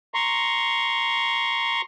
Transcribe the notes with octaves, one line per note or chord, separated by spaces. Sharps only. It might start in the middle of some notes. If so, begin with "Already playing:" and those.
A#5 C6 C#6